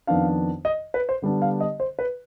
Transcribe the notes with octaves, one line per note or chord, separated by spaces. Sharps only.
F2 D#3 B3 D4 F5
D#5
B4
C5
D3 G3 B3 D4
F5
D#5
C5
B4